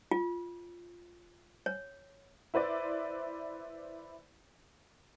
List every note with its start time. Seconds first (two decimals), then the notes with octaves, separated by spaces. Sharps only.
0.11 F4
1.66 C#5
2.54 E4 B4 C5 D5